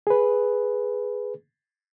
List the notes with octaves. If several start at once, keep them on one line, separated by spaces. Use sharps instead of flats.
G#4 B4